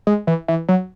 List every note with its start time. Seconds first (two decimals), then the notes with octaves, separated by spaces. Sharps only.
0.07 G#3
0.27 E3
0.48 E3
0.69 F#3